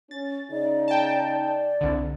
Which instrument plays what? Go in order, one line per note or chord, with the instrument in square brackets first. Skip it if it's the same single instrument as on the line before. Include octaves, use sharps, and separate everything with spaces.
[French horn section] C#4 [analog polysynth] A6
[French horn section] C#3 D#4 [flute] D5
[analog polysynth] G5 A5
[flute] D5
[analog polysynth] C2 D3